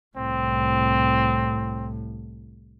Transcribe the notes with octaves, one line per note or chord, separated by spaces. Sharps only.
C2 A2 C4